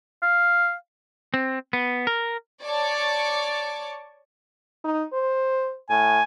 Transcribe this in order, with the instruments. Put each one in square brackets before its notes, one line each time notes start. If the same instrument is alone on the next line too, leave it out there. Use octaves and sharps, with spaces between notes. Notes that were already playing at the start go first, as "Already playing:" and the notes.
[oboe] F5
[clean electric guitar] C4
B3
A#4
[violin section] C#5 D5 A5 C#6 D6
[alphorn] D#4
C5
[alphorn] A2 [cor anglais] G#5